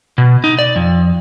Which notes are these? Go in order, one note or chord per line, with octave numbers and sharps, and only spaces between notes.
B2
D#4
D5
F2